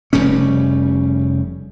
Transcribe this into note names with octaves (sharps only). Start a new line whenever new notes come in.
F1 C#3 G3 C#4